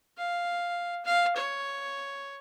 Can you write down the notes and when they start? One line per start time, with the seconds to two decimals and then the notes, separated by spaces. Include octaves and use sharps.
0.18 F5
1.05 F5
1.36 C#5